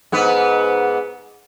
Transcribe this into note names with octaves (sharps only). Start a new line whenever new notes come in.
G#2 B3 B4